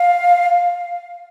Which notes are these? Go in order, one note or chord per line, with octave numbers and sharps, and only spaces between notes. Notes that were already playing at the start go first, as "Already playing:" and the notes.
Already playing: F5